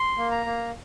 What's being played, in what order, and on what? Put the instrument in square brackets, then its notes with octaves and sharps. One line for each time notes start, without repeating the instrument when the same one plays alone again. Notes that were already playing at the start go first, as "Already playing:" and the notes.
Already playing: [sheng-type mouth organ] C6
A#3
A#5
A#3